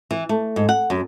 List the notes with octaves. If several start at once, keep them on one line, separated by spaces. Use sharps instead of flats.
E3
A3
G#2
F#5
F#2